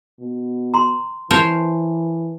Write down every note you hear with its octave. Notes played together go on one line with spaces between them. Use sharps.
B2
A#5 C6
E3 A#4 C5 C#5 A5